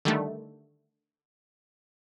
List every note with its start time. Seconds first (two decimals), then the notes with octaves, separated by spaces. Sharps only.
0.05 D3 D#3 G3 A3